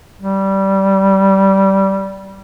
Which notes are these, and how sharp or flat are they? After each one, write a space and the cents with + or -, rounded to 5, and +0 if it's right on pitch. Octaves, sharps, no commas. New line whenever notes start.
G3 -15